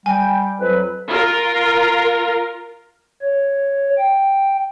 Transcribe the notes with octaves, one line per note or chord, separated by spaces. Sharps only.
G3 G5 G#5
F2 F#3 B4
F4 A#4
C#5
G5